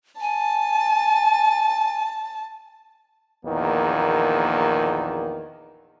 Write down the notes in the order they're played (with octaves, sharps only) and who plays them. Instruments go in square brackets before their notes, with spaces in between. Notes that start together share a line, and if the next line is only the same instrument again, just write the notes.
[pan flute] G#5 [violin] A5
[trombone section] A#1 E2 D#3 A#3